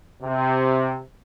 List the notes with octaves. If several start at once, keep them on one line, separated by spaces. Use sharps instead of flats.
C3